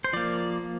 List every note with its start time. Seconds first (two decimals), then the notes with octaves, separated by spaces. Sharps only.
0.04 C5
0.13 F3 A#3 D5